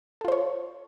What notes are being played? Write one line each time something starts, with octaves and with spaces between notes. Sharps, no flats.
F4 A4 C5 C#5